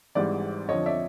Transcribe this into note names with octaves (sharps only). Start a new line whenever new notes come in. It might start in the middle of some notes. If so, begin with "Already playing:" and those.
G#1 G#2 E3 G3 D5
F2 D3 F3 C#5 D#5
D5 E5